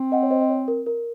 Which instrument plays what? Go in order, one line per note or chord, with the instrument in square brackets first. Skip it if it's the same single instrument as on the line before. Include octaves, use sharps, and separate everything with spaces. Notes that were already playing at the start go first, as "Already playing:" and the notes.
Already playing: [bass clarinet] C4
[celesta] D#5 F#5
C#5
C5 D#5
D#5
C#5
A#4
A#4